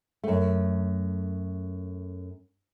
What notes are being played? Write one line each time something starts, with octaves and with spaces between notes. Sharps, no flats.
F#2 A3